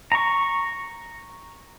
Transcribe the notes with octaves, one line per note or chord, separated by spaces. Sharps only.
A#5 C#6